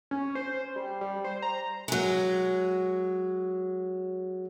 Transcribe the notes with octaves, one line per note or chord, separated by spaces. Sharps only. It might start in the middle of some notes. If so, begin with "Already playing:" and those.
C#4
C5
G3
G3
C5
A#5
F#3 G#3